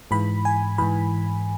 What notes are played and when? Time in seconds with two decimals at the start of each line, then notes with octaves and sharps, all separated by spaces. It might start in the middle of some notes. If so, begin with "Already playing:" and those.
0.11 G#2 E3 B5
0.45 G#5
0.78 G#2 E3 B5